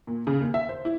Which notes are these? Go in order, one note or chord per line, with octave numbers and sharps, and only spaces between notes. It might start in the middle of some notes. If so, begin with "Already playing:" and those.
A#2
C#3
D#2
E5
C5
E4